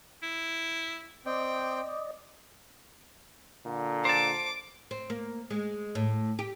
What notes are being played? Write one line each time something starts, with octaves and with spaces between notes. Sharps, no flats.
E4
C4 D5 D#5 G5
A#2 D3
C5 A5 D6
C4
A#3
G#3
A2
G4